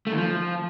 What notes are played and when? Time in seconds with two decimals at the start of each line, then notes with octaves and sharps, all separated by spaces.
0.07 A3
0.12 D#3
0.17 F3